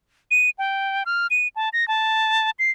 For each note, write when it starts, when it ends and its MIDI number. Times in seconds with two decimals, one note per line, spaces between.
0.31 0.50 99
0.58 1.04 79
1.06 1.27 89
1.31 1.48 99
1.56 1.69 81
1.73 1.87 94
1.88 2.50 81
2.59 2.71 96